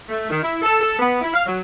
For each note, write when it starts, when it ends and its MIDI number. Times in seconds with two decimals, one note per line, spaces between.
0.09 0.28 57
0.30 0.43 51
0.43 0.58 64
0.62 0.79 69
0.81 0.98 69
0.99 1.19 59
1.22 1.31 64
1.34 1.45 77
1.46 1.61 54